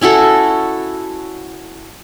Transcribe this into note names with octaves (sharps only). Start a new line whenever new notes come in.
C#4 E4 F#4 A4